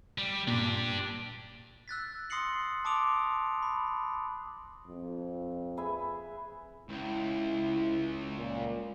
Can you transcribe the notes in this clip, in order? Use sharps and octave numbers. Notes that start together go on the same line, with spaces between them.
G3
A#2 D4 G4
E6 F#6 A6 B6
C6 D#6 A#6 C7 C#7 F#7
A5 C6 D6 D#6 D7 F7
B5
F2
G#4 B4 E5
C#2 E4
A#2